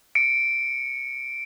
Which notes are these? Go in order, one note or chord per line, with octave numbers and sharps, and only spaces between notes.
C#7 D7